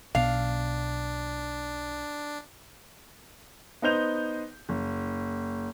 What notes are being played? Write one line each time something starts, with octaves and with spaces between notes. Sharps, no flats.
B1 B2 B3 D4 F5
B3 D#4 C5 G6 F7
F#1